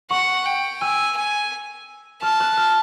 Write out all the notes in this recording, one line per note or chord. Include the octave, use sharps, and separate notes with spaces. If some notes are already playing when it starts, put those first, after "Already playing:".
F#5 C#6
G5
G#5 E6
G#5
A5 F6
F#6
F6